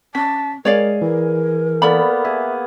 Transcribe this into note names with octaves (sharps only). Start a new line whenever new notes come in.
C#4 A5 B6
G#3 G#4 A#4 C#5 D5 F5
E3 A#4
A#3 B3 A4 D5 B5
G#4 E5